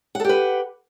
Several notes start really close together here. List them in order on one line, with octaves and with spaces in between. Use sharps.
F#5 A4 G4 B4